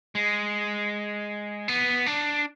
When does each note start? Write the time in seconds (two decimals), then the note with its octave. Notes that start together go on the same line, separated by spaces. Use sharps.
0.15 G#3
1.68 B3
2.06 D4